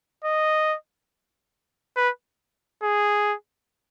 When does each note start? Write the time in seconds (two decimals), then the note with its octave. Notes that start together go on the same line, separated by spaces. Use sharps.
0.24 D#5
1.97 B4
2.83 G#4